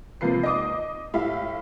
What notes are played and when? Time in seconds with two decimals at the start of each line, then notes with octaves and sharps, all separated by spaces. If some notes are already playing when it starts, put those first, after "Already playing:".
0.21 C3 F3 A#3 B4 C7
0.43 D#5 D6 D#6
1.14 A2 G4 E5 F5